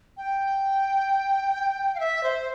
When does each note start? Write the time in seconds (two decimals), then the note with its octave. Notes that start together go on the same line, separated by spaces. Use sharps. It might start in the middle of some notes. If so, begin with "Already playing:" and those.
0.17 G5
1.95 F5
2.00 E5
2.24 C5